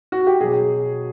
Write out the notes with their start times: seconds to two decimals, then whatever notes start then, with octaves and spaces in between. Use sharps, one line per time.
0.12 F#4
0.27 G4
0.40 B2 F#3 G#4